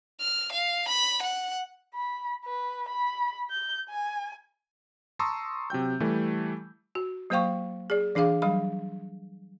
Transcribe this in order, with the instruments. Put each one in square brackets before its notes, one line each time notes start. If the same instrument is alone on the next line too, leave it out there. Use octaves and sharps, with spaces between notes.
[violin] F6
F5
B5
F#5
[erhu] B5
B4
B5
G6
G#5
[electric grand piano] A5 A#5 C6 C#6 D#6 E6
C3 F#3 G5 G6
E3 G3 A3
[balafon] F#4
F#3 A#3 C5 F5 G5 C#6
G#4 D5
E3 D4 G#4 F5 D6
F#3 G3 F5 B5